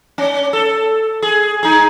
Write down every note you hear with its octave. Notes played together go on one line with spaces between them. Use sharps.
C#4
A4
G#4
D#4 G#4